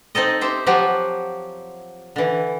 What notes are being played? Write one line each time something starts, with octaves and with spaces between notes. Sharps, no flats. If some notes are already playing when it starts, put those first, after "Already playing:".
C4 D#4 A4 D#5
G4 C5 E5
F3 F#3 G4 F#5
D3 E3